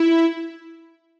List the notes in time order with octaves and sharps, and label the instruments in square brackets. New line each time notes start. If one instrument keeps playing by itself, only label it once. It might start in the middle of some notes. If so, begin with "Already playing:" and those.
Already playing: [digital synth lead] E4